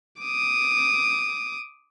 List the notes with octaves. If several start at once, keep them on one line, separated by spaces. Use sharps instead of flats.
D6 D#6